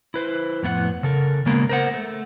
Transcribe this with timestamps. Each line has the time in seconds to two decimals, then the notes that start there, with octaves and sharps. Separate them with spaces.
0.14 E4 B4 C5
0.63 F2 A2 B3 E4 F#5
1.03 C#3 A4 A#4
1.46 C#3 G#3 A#3 B3
1.69 A#4 C5 F#5
1.94 A3